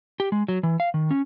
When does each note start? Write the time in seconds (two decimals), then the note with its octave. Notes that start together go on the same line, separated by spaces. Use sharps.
0.20 G4
0.32 G#3
0.48 F#3
0.63 E3
0.80 F5
0.94 D#3
1.11 C#4